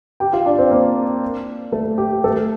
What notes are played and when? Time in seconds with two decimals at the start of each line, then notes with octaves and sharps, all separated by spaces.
0.20 G4 G5
0.33 F4 F5
0.46 D4 D5
0.58 C4 C5
0.71 A#3 A#4
1.72 A3 A4
1.98 G4
2.24 A3 A4